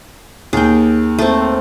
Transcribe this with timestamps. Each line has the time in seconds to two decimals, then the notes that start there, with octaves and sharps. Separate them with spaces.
0.53 D#2 G#4 G5
1.19 A3 C4